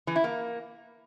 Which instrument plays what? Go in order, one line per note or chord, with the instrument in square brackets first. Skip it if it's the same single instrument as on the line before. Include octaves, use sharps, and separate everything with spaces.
[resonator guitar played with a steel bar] E3
E4
A#3